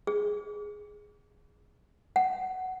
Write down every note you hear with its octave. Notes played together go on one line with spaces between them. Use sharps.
G#4
F#5